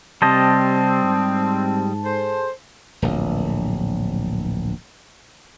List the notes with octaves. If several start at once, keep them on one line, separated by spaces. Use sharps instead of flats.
C3 G3 C4 C5 D#5 A5
G#2
G#4 A4 C5
D1 A#1